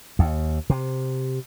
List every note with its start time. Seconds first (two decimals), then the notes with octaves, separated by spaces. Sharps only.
0.19 D#2
0.70 C3